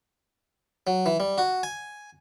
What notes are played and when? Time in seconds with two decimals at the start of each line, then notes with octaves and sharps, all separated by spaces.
0.87 F#3
1.06 E3
1.20 G3
1.38 F#4
1.63 G#5